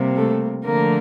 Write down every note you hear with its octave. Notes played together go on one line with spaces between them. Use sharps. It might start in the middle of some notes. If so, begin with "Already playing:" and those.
Already playing: C3 G3 A#3
A3 A4
D3 F3 A3 A#3 A#4